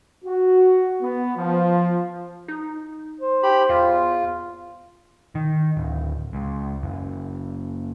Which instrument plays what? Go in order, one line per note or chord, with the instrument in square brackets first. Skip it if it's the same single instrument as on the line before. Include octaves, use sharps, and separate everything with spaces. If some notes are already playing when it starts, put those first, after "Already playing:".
[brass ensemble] F#4
B3
F3
[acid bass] D#4
[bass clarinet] C5
[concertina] G4 B5
[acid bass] E2 [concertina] F4
[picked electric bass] D#3
D1
C#2
F#1